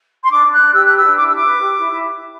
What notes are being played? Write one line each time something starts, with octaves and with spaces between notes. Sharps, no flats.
C6
D4 D6
D4
F#6
D4
G4 E6
B4 F#6
E6
D4
E4 D6
E6
E4 D6
B4
G4
E4
E4